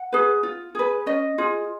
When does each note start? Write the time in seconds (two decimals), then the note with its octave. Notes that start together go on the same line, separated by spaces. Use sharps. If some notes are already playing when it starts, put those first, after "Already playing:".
Already playing: F#5
0.12 G#4 B4
0.43 F4
0.75 G#4 B4
1.06 C#4 D#5
1.38 F4 G#4